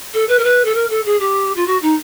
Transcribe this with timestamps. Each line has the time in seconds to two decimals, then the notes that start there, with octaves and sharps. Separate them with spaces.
0.13 A4
0.28 B4
0.38 A#4
0.44 B4
0.64 A4
0.74 A#4
0.89 A4
1.05 G#4
1.20 G4
1.56 F4
1.66 F#4
1.82 D#4